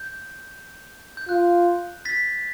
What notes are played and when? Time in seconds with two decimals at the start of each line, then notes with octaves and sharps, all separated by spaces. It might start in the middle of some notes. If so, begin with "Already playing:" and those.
Already playing: G6
1.17 G6
1.29 F4 F#6
2.05 A6 B6